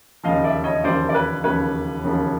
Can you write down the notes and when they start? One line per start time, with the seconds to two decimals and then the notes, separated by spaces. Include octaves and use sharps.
0.23 E1 D#2 C#3 F3 D#5 F5
0.44 D5 E5
0.64 C#5 D#5
0.84 E1 D#2 C#3 F3 C5 D5
1.09 D5
1.14 B4 C#5
1.44 E1 D#2 C#3 F3 B4 C#5
2.04 E1 D#2 C#3 F3